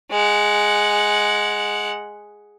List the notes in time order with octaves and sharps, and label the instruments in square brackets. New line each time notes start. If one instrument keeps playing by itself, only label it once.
[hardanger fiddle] G#3 F#5